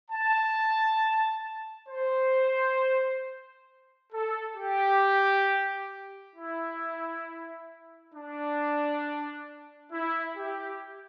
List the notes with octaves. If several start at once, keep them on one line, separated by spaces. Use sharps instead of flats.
A5
C5
A4
G4
E4
D4
E4
G4